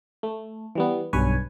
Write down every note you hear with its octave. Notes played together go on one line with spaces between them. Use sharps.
A3
E3 G3 B3
B1 G2 B4 C#5 G#5